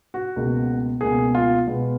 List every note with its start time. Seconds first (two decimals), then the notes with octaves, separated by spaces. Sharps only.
0.14 F#4
0.36 C#2 B2 A#3
1.01 C#2 B2 A#3 G#4
1.35 F4
1.67 B2 G#3 B3